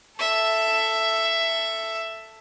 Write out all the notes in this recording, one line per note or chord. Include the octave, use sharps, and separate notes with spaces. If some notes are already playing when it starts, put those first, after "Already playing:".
A4 E5